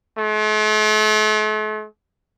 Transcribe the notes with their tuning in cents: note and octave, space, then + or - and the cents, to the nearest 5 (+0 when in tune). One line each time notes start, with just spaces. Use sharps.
A3 -45